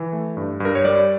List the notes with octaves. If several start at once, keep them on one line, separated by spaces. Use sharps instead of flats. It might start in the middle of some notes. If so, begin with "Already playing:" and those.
Already playing: E3
A3
G2
G2
A#4
C#5
G3 D5